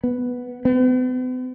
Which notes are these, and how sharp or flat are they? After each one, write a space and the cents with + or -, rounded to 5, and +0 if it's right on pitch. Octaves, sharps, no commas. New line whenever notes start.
B3 +0
B3 +45